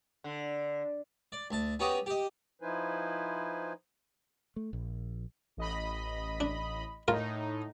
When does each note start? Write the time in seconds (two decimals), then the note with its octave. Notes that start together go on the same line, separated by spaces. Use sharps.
0.24 D3
1.32 D5
1.51 D2 A5
1.80 B3 C#4 F#4 G4 A#5 D#6
2.06 G4 D#5
2.62 F3 D#4 E4 B4 C5 G#5
4.56 A3
4.73 A#1
5.57 A1 D#5 B5
6.40 D4
7.08 A2 D#4 F4 A#4